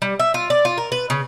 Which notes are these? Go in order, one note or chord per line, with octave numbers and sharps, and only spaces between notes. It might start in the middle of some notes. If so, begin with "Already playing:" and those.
G3
E5
F4
D5
F4
A#4
B4
C#3